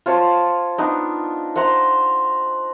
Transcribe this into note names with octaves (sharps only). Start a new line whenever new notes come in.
F4 C5 C#5 A5
B3 D4 D#4
C5 F#5 A#5 C6